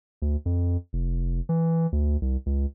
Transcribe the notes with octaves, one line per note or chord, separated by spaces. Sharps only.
D2
F2
F1
E3
D2
C2
C#2